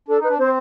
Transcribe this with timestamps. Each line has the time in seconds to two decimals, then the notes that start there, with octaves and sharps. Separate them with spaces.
0.08 D4 A4
0.19 D#4
0.24 D4 B4
0.39 C4 C5